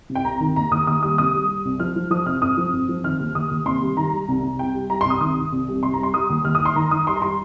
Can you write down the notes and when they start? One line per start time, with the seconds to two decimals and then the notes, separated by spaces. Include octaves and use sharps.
0.10 C3
0.15 G5
0.25 C2 A#5
0.40 D#3
0.56 D#2 A#5
0.71 D#2 D#6
0.87 D#2 D#6
1.03 G3 D#6
1.18 C2 D#6
1.34 G3
1.49 G3
1.65 C2
1.80 F3 F6
1.96 F3
2.10 F3 D#6
2.26 C3 F6
2.42 F2 D#6
2.57 F3
2.73 F2
2.89 F3
3.04 D#3 F6
3.20 D#2
3.35 D#2 D#6
3.51 D#2
3.66 C3 C6
3.82 G3
3.97 D#3 A#5
4.12 G3
4.28 C2
4.43 C2
4.59 G3 G5
4.74 G3
4.90 G3 A#5
5.01 C6
5.05 C2 D#6
5.20 D#3 D#6
5.36 D#3
5.52 C2
5.68 G3
5.83 C3 C6
5.93 A#5
5.99 G3 C6
6.14 G3 D#6
6.29 D#2
6.45 D#2 F6
6.55 D#6
6.60 D#3
6.65 C6
6.75 D#3 A#5
6.91 D#3 D#6
7.07 G3 C6
7.16 A#5
7.22 G3 C6